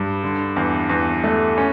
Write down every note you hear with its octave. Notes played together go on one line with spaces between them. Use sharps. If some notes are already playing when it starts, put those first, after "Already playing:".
Already playing: G2
D3
E2
E2
A3
C#4